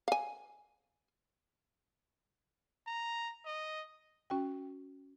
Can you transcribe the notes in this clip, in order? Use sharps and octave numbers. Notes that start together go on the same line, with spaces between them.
F5 G#5
A#5
D#5
C#4 F#4 G5